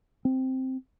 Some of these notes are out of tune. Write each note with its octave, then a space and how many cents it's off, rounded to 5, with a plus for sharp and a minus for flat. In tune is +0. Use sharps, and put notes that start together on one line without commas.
C4 +0